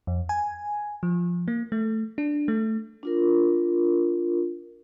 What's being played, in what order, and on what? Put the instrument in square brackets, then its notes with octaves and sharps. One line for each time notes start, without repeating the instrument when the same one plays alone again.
[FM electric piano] F2
G#5
F3
A#3
A3
D4
A3
[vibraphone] D4 F4 A#4